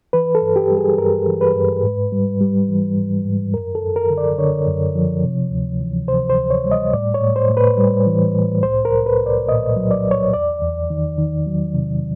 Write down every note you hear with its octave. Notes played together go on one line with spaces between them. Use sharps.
E3 B4
A4
G2
G4
G3
G#4
G2 A#4
E3
B4
G2
G#2
G3
G3
E3
G#2
G#2
F#2 A#4
A4
F#2
A#4
D3
D5
D3 C#5
F#2
F3
C3
D2
E3
C3 C5
C5
D2
C#5
G3
D#5
A2 D5
C#5
A2
C5
A2
B4
G3
E3
A2
C2 C5
A#4
C2
B4
C2
D5
A#2 D#5
F#3
D5
C2
C#5
E2 D5
E2
D#3
D#3
F#3
C3